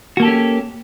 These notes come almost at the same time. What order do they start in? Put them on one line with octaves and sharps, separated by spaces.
F#4 A#3 A4 G4 C#4